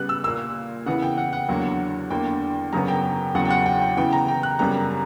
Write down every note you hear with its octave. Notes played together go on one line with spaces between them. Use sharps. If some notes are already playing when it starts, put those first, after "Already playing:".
Already playing: C#3 G3 B3 F#6
E6
A#2 A#3 E6
C#3 E3 B3 F#5
G5
F#5
F#5
E2 D3 F#3 A#3
E2 D3 A#3 G5
F#2 C#3 F#3 B3 A#5
G5
E2 C#3 F#3 F#5
G5
F#5
G5
G5
C#3 E3 B3 G5
A#5
G5
F#6
F#2 C#3 G3 B3 A#5